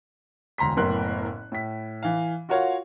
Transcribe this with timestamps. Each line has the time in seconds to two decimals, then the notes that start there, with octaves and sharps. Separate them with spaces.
0.58 E1 D2 A#5 C6 B6
0.76 F#1 A2 B3 A#4 C6 F#6
1.52 A2 B6
2.03 E3 F5
2.49 F4 F#4 A#4 C#5 F5 F#5